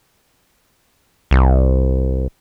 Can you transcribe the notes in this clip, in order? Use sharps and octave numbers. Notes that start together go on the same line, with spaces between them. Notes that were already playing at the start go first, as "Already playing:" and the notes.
C2